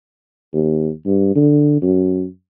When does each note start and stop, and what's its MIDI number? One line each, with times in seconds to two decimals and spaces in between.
0.54 0.90 39
1.06 1.34 43
1.36 1.80 50
1.82 2.24 42